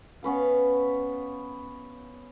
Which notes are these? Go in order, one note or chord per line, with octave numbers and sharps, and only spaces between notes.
B3 C#4 B4 F5